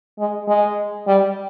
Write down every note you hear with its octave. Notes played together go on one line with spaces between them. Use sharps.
G#3
G#3
G3